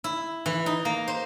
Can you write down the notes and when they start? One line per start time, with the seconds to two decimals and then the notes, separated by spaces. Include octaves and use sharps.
0.04 E4
0.46 E3
0.66 D#4
0.85 A#3
1.08 C5